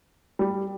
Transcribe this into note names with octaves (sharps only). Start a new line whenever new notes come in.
G3